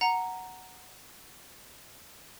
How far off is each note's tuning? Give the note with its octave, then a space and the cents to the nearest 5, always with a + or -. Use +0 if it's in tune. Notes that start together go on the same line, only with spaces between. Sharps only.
F#5 +0 A#5 +0